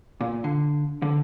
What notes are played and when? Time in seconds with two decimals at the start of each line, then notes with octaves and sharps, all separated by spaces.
0.21 A#2
0.44 D3
1.02 D3